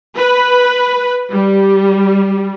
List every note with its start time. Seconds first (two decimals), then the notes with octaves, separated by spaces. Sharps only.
0.16 B4
1.31 G3